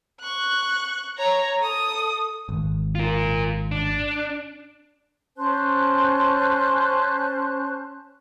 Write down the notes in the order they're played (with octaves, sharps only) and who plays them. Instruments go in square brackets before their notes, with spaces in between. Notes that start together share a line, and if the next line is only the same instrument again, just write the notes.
[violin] C#6 F#6
C#5 A#5
A4 D#6
[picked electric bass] G#1
[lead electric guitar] F4 A#4
D4
[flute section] C#4 C5 A5 F#6